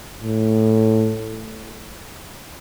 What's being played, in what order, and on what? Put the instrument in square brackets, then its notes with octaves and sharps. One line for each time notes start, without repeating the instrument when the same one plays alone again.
[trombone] A2